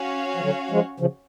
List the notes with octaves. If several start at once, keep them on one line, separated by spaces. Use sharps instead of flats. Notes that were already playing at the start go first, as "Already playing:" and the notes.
Already playing: C#4 F#4 C#5 F5
F3
D3 F#3
F3 G#3
C#3 F3